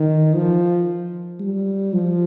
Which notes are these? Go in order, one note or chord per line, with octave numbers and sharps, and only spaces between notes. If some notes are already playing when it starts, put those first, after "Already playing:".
Already playing: D#3
F3
G3
F3